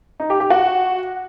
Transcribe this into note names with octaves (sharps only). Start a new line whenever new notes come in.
D#4
G4
G4
F#4